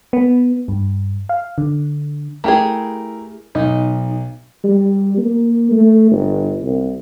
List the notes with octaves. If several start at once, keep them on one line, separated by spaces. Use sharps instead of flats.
B3
G2
F5
D3
A3 E4 G4 G#4 A#4
B1 D#4
G3
A#3
A3
G1
C2